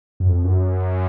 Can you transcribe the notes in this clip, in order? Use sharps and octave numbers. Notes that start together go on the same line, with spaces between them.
F#2
F2
F#2